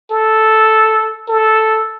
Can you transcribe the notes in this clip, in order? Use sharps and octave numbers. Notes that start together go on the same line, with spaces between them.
A4
A4